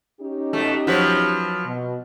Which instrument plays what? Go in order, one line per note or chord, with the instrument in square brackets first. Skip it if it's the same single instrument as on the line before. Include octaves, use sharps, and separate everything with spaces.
[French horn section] C#4 D#4 G4
[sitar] B2 A3
F3 F#3 B4
[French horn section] B2